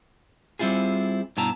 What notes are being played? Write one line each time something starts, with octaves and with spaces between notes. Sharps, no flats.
G3 C4 E4 F4 G#4
G2 B2 B3 E4 A5 A#5